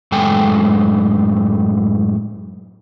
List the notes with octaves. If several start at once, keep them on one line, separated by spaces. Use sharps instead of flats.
F#2 A2 G#3 A4 G5 G#5